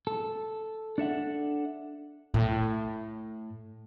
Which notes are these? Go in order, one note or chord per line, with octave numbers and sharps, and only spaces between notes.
A4
D4 A4 E5 F#5
A2